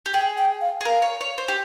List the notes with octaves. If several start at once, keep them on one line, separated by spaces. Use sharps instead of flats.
G4
G#4 G5
G5
F5
G#4
A#4 F5
C#5
C#5
C5
G4